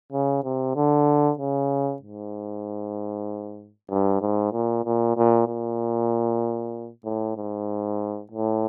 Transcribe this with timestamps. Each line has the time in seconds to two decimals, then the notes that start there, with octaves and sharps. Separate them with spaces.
0.12 C#3
0.44 C3
0.76 D3
1.39 C#3
2.02 G#2
3.90 G2
4.21 G#2
4.53 A#2
4.85 A#2
5.17 A#2
5.47 A#2
7.04 A2
7.37 G#2
8.32 A2